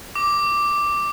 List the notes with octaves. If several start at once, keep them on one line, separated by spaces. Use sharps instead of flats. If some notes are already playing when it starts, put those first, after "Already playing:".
D6